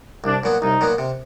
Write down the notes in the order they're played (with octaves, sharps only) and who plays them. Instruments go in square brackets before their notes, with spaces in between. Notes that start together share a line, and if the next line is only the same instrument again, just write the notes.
[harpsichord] C2 [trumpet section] D4
[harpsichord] A#2 F#3 B3
[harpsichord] C2 [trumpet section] D#4
[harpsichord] A#2 F#3 B3
C3